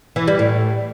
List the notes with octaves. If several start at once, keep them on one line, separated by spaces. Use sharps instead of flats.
E3
G3
A2